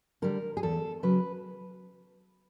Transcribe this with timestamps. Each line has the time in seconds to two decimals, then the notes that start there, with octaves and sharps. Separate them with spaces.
0.22 D3 G3 A#4
0.57 G#4
0.63 E2 A4
1.03 C#3 F#3 B4